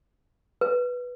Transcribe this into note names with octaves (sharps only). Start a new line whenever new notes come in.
B4